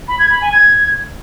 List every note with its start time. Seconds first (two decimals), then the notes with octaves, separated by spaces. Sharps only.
0.08 B5
0.19 G#6
0.30 B5
0.41 G#5
0.52 G#6